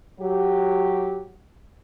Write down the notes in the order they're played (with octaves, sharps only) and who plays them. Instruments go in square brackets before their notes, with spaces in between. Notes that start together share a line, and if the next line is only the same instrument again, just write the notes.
[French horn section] F#3 G4